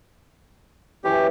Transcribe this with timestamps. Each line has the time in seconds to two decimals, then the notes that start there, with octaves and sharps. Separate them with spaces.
1.04 F#2 E3 G4 C#6